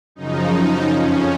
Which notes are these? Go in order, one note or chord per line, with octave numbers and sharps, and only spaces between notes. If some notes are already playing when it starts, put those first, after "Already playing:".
F#2 C#3 F3 D#4
F2 F3 C#4